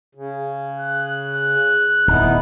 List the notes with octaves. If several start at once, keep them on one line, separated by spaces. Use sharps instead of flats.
C#3
F#6
D1 B3 D#4 E4